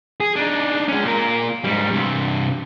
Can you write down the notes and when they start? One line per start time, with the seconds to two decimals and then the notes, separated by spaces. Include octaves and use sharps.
0.20 G#4
0.36 D4 D#4
0.88 G#3 C#4
1.03 A#2 A#4
1.64 G#2 G3
1.91 G2 C3